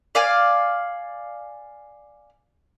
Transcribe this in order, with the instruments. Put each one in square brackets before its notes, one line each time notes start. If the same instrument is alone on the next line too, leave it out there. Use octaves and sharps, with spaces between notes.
[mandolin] D5 F5 G#5